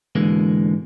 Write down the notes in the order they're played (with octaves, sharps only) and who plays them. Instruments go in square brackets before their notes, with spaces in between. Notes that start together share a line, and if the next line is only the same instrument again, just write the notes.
[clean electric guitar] G#2 B2 D3 E3 G#3 A#3